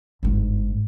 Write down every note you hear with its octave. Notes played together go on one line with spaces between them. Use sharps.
G1 G#2